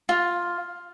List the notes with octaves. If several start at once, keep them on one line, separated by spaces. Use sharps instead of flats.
F4